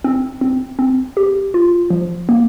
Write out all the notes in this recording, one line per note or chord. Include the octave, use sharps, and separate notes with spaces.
C4
C4
C4
G4
F4
F3
A#3